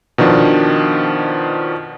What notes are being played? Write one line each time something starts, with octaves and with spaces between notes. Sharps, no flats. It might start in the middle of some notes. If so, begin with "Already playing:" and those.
B2 D#3 F3 D4